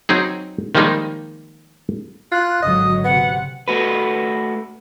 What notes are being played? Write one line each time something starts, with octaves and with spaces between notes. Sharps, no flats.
F#3 C4 D#4 G#4
D#3 F3 G3 G#3 A#3 D#4
F4 F#6
G#1 D3 F#3 D#5 D#6
C3 B3 F#5
A3 F#4 B4